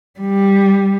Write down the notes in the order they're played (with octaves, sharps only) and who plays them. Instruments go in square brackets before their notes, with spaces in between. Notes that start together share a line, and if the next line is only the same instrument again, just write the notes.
[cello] G3